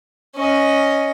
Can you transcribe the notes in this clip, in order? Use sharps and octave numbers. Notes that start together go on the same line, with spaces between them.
C#4 D#5